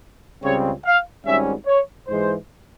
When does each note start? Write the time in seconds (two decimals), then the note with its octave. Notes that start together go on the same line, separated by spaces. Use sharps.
0.43 C#2 C#3 G3 C4 C#5
0.85 F5
1.25 G#1 G#2 G3 C#4 E5
1.66 C#5
2.07 G#2 E3 G#3 C5